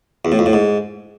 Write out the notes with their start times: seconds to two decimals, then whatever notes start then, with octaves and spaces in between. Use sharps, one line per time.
0.25 E2
0.32 A2
0.39 F2
0.46 A2
0.53 G#2